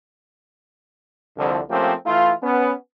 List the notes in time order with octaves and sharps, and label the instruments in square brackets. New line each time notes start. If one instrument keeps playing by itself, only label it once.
[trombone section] C2 F2 D3
F3 A3 A#3 C4 C#4 G4
E3 A3 E4 F4
B3 C#4